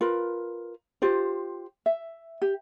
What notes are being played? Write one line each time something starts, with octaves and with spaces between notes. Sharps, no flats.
F4 A#4 B4
F4 G4 C5
E5
G4